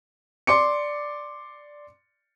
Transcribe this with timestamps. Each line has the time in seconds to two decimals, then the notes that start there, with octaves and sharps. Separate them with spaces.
0.47 D5 C6 D6 C#7